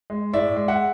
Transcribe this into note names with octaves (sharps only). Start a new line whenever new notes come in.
G#3
A2 D5 E5
G#3
E5 F#5